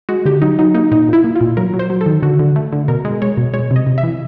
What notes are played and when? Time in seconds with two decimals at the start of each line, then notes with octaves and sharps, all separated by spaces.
0.09 G#3 F#4
0.25 D3 G4
0.41 F#3 D#4
0.59 F#3 D#4
0.75 A#3 D#4
0.92 A#2 D#4
1.08 A#2 E4
1.24 A#3
1.36 F4
1.41 A#2
1.57 F#3 A#4
1.74 F#3
1.79 C5
1.90 F#3
2.01 A4
2.06 D#3
2.22 D3 F#4
2.39 D3
2.56 A3
2.72 D3
2.88 B2 A#4
3.05 G#3
3.22 G#3 C#5
3.38 B2
3.54 G#3 C#5
3.71 C3
3.76 D#5
3.86 C3
3.98 E5
4.03 E3